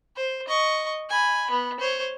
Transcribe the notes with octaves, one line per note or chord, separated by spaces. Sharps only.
C5
D#5 C#6
G#5 B5
B3
C5 C#5